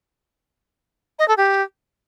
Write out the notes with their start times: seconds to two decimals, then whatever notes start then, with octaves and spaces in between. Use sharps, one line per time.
1.19 D#5
1.28 A4
1.37 G4